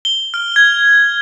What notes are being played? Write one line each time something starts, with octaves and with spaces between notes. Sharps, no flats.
G7
F6
G#6